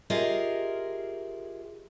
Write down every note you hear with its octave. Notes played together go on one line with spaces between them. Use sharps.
F4 G4 G#4 A#4 D#5 E5